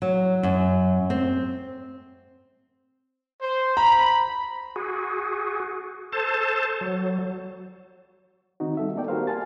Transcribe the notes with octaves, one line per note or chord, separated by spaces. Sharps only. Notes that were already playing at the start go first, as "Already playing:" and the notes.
F#3
F#2
C4
C5
A#5 B5
F#4 G#4
A4 C5 A5
F#3
D#3 C4 D#4 F#4
G3 A4 E5
A#3 B3 D#4 A4 D5 G5
F#4 G4 A#4 C5 F5
F5 G#5 A5 A6